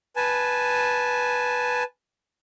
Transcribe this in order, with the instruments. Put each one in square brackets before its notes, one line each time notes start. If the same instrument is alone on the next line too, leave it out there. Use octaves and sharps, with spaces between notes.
[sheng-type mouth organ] B4 G#5 A5